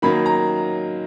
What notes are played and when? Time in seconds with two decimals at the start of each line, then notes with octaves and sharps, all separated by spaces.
0.02 D#3 F#3 A#3 B5
0.26 A#5